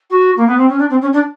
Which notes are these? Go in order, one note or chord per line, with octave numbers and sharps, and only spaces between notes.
F#4
A#3
B3
C4
C#4
D4
C4
C#4
D4